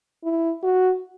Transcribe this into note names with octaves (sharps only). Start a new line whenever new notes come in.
E4
F#4